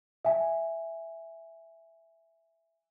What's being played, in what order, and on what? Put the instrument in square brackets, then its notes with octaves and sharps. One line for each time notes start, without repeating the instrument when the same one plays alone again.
[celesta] E5 G#5